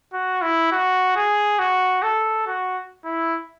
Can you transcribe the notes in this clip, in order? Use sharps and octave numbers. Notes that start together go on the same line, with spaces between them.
F#4
E4
F#4
G#4
F#4
A4
F#4
E4